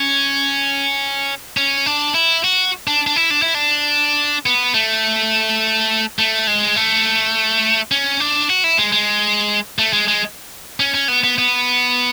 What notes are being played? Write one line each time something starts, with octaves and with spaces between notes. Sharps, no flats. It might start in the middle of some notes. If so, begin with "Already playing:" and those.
Already playing: C#4
C#4
D4
E4
F#4
D4
D4
E4
D4
E4
D4
B3
A3
A3
G#3
A3
C#4
D4
F#4
E4
G#3
G#3
A3
G#3
G#3
C#4
C#4
B3
B3
B3